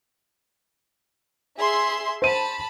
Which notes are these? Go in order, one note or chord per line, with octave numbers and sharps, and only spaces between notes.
G#4 E5 C6
C5 A5 B5 D#7